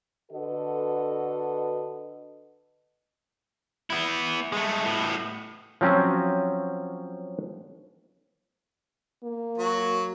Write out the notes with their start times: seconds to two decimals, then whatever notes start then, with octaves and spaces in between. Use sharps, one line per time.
0.32 D3 F#4 A4 B4 D#5
3.90 B3 E4
4.52 G#3 A3
4.84 A2 B3
5.81 F3 F#3 C4 C#4 F#4
9.24 A#3
9.58 F#3 F#4